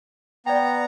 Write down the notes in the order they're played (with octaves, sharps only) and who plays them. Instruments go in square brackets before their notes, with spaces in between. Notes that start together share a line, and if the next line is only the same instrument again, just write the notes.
[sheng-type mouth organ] B3 A#5 [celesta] D5 G5